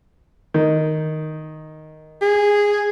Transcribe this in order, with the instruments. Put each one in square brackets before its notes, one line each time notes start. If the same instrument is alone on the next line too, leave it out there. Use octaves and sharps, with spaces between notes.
[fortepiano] D#3
[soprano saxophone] G#4